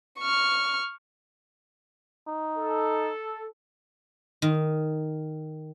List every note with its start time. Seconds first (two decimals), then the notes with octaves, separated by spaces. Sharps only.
0.20 C#6 F6
2.28 D#4
2.57 A4
4.42 D#3